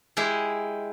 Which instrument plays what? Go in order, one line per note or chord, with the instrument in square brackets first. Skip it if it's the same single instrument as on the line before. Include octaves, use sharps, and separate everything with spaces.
[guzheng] G#3 E4 G4 G#4